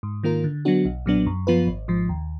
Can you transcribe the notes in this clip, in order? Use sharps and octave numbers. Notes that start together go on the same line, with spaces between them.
G#2
D#3 A#3 F4 A#4
D3
F#3 B3 D4 F#4
B1
A#2 F#3 B3 D4
F#2
F3 B3 F4 B4
G#1
G#2 F3
D#2